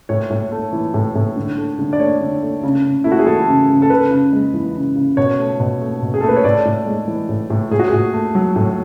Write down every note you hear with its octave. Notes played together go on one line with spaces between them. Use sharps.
A2 C#5
A2
A3
E3
A2
A2
D3
A3
D3
D5
A3 C#5
D3
A3
C#3
C#3
A3 E4
F#4
G#4
E3 A4
C#3
C#3
A4
C#3 B4
C#3
G#3
E3
C#3
C#3
B2 C#5
A3
B2
A3
B2
G#4
A4
A3
B4
C#5
A2 D5
A2
G#3
E3
A2
A2
A2 G#4
F#4
A2 G#4
A3
F#3
A2